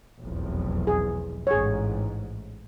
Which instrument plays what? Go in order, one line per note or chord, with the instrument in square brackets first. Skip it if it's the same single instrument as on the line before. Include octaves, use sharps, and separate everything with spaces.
[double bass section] F1 B1 E2
[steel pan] G#4
[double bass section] A1 G#2 [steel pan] G#4 C#5